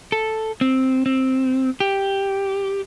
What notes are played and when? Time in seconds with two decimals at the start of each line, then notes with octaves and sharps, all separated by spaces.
0.12 A4
0.61 C4
1.06 C4
1.80 G4